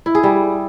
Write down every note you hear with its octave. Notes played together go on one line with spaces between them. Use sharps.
E4
G#4
G3